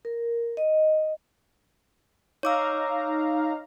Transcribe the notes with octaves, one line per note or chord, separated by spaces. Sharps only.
A#4
D#5
D#4 C#5 F5 A#5 D6 E6